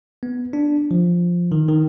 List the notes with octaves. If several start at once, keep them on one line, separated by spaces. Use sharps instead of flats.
B3
D4
F3
D#3
D#3